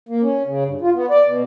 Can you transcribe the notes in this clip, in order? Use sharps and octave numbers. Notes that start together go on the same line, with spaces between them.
A#3
C#4
C#3
G2
F4
B3
D5
B2